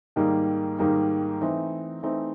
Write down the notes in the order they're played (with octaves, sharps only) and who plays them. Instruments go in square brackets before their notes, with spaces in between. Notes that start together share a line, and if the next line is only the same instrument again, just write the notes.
[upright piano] G#2 D#3 G3 A#3 D#4
G#2 D#3 G3 A#3 D#4
E3 A3 C4 D#4
E3 A3 C4 D#4